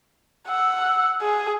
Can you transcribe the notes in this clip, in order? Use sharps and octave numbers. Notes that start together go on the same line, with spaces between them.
F#5 E6
G#4